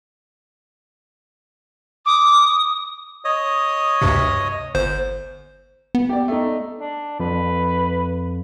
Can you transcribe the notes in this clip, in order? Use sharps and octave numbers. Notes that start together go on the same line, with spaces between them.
D6 D#6
C#5 D#5 D#6
D2 G2 C3
G1 C5
B3
G4 D5
A3 D#4
D4
F2 B4